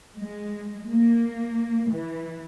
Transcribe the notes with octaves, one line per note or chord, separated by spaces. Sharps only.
G#3
A#3
E3